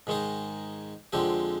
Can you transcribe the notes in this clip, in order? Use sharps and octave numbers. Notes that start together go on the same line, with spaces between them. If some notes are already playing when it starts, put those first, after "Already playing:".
G#2 D#3 G#3 D#4 G#4
F2 D3 G#3 C4 G4